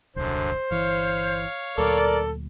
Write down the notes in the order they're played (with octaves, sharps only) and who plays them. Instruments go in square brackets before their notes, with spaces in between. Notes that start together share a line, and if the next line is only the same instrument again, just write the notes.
[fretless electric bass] D#1 C2 [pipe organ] F#2 D3 [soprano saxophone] C5
[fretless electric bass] G1 E3 [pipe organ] C#5 F5
[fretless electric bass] D2 A#2 F#3 [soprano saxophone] A4 [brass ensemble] A#4 D5